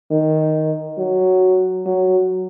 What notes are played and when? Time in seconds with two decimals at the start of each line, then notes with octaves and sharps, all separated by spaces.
0.11 D#3
0.98 F#3
1.86 F#3